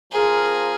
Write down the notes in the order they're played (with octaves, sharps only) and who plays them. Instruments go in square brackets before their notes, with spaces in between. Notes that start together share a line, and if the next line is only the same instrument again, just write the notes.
[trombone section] F3 C4 F4 A#4 [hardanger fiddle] G#4